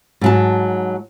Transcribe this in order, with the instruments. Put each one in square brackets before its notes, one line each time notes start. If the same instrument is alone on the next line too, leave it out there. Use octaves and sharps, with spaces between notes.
[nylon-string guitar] G#2 F#3 A5